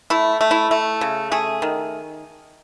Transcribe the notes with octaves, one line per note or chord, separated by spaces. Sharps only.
A3 E4
A3
E4
A3
C#3
A3 G#4
D#3